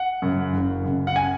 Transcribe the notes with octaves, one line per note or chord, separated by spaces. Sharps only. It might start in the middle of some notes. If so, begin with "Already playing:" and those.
Already playing: F#5
F#2 C#3
F#1
F#2 C#3
F#5
G#5